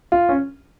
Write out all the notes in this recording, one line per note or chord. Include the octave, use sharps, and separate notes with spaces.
F4
C#4